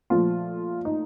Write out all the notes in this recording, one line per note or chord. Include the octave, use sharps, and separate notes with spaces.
A#2 F3 A3 F4
D#4